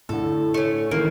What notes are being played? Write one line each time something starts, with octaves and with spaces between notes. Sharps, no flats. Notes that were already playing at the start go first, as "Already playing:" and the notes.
A2 D3 A4
A3 C#4
D#3 E3 A3 A#3